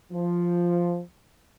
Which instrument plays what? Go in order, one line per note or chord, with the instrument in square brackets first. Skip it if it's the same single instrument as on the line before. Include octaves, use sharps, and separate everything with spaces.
[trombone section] F3